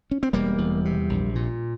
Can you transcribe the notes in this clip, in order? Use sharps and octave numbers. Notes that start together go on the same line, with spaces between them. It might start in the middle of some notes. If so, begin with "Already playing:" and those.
C#4
C4
E1 G3 A#3
E2
C3
A#1
A#2